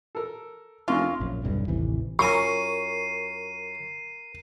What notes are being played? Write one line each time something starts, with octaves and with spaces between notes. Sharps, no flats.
A4 A#4
F1 C#4 D4 E4 F4 A#4
A#1 F#2
E1 B1 G2 C3
A1 D#2 C3 E3
F#2 F4 A#4 G#5 C#6 C7 D#7